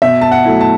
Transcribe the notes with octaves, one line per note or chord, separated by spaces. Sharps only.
B2 E5
A5
F#5
F#3 A3 E4
A5